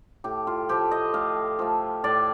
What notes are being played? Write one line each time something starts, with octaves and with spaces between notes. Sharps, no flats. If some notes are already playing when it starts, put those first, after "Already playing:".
A2 G4
F4
F3 A3 G4
D#5
A2 F5
F3 A3
A2 D5